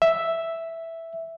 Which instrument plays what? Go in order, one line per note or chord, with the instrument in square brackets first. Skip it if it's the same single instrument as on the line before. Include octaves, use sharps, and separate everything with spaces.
[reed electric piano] E5